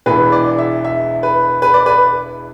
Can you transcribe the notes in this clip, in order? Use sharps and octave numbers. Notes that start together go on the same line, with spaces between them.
E1 E2 E3 B4
D5
E5
E5
B4
B4
D5
B4